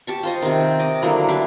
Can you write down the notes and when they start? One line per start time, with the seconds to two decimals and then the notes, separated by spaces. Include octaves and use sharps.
0.07 G4 A5 C#6
0.23 F4 C5 D#5
0.42 C3 D#3
0.79 D#5 D6
1.02 D3 F#3 A#3 E4
1.29 D4 E4 G4 B4